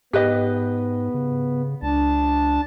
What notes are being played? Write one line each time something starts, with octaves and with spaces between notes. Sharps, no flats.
G#2 B3 G4 B4 D#5
C#3
C#2 D4 A5